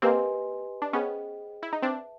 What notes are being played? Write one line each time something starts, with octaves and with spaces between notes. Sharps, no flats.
A#3 C4 G4 B4 D#5 G#5 C6
D4
B3 C#4 G#4 C5 D#5 G5
E4
D#4
C4 D4 B4 E5 A5